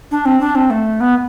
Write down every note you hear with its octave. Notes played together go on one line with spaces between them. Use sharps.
D4
C4
D4
C4
A3
B3